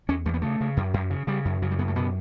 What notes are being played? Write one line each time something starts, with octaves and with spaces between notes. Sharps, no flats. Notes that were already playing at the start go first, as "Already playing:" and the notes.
E2 C#4
E2 A3
B3
C#3 A3
C#3
F#2
F#2
C#3
C#3 G3
F#2
C#3 F#3
G3
F#2 B3
A3
B2 B3